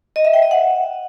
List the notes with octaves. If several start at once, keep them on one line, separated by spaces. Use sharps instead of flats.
D#5
E5
G5
D#5
F#5